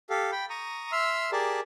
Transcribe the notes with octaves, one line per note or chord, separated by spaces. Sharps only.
G4 A4 F5
G5 B5
A#5 C#6 D#6
E5 C6 E6 F6
G4 G#4 A#4 D5 A5